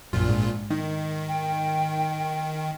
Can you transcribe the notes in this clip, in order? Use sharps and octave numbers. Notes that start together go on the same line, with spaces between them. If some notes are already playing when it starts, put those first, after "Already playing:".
A#1 F#2 A#2 F4
G#2
D#3 D#4
G5